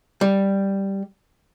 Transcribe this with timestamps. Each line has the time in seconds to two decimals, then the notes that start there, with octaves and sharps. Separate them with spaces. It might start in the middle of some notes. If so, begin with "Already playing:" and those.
0.21 G3